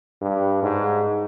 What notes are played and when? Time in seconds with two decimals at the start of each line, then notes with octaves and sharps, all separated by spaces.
0.22 G2
0.63 G#2